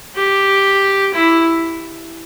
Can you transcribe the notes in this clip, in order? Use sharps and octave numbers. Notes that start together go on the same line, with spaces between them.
G4
E4